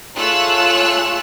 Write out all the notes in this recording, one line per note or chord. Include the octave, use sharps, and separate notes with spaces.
A3 F4 G#4 C#5 E6 F#6